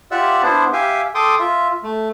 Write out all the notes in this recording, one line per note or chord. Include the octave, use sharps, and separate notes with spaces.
F4 G4 D5 E5 F#5 E6
B3 D4 E4 C5
G4 E5 F5 G5 G#5
A4 G5 C6 D6 D#6
F4 E5
A3